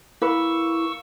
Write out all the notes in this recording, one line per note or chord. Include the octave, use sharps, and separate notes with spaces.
A#3 E4 B4 C#6 E6